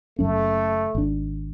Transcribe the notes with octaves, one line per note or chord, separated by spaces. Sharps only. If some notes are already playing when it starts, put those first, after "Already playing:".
F#1 F#2 A3 C#4
G#1 D4